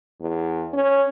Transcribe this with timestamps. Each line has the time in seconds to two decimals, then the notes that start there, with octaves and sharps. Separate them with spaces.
0.21 E2
0.73 C#4